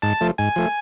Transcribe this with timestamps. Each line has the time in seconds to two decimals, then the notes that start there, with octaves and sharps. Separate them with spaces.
0.02 G#2 A5
0.21 F3 A3
0.38 G#2 G#5
0.56 F3 A3